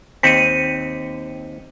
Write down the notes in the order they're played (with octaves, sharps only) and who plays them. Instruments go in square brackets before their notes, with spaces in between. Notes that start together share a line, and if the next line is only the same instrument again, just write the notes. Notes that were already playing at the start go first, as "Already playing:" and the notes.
[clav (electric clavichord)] D#2 C4 [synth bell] B6 C#7 D#7